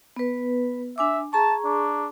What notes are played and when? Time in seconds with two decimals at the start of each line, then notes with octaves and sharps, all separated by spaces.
0.16 B3 B4
0.98 D4 E5 G#5 D6
1.33 G#4 A5 A#5 C#6
1.64 D4